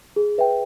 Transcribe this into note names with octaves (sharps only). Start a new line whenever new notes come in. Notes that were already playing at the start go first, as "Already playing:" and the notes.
G#4
B4 E5 G5